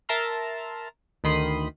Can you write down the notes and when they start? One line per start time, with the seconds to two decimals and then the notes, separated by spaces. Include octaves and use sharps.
0.09 A#4 E5 A5 A#5 C6 F6
1.24 D2 D#3 B5 C6 D#6 C7